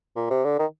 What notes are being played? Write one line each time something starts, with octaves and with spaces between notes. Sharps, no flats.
A#2
C3
D3
D#3